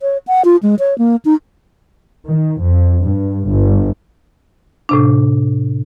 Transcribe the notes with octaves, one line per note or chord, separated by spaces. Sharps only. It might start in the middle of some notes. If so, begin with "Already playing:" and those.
C#5
F#5
F4
G#3
C#5
A#3
D#4
D#3
F2
G2
G1
A2 C3 D4